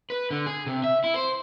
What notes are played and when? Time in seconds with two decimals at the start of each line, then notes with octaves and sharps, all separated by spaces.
0.10 B4
0.31 D3
0.46 G#4
0.67 C3
0.84 E5
1.04 E4
1.16 C5